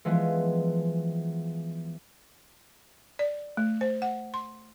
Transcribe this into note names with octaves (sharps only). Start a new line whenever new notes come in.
E3 F3 G#3 B3
D5
A3
C5
F#5
C6